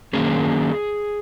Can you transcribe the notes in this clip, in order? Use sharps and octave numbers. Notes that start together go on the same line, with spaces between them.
D#3 F#3 A#3 C#4 G#4